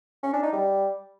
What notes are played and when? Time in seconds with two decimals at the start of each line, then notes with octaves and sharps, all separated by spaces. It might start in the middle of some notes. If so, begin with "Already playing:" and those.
0.23 C#4
0.33 D4
0.43 D#4
0.53 G3